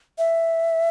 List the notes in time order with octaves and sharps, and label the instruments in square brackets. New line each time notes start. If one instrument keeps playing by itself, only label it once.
[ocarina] E5